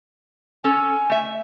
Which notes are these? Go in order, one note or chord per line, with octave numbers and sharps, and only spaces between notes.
C#4 A4 G#5
A3 E5